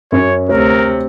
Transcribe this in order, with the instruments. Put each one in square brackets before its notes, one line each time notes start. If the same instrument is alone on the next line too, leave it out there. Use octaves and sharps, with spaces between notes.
[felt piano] F#2 C#4 [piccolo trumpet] C#5
[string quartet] D2 C3 [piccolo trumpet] A#4 [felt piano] C#5